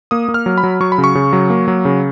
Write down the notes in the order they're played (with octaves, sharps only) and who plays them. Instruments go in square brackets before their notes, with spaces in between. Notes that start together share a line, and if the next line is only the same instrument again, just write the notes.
[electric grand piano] A#3 D#6
A#3
F6
F#3
B5
F#3
F#3 C#6
B5
C#3
C#6
C#3
F#3
A#3
F#3
C#3